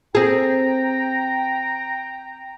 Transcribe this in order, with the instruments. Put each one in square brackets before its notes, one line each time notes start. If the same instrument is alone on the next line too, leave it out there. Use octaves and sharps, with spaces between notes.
[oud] C4 G#4 [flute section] G5 A#5